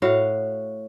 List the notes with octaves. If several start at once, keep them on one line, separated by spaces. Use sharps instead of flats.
A2 F#4 F5